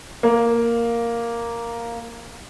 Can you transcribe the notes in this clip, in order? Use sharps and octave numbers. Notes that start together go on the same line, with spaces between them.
A#3